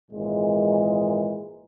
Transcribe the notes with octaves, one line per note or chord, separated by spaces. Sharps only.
G#1 A#2 E3 G#3